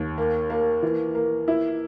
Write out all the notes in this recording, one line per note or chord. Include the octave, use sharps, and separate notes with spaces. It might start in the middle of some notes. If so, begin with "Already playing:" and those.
Already playing: D#2
A#3
A#3
E3
A#3
E4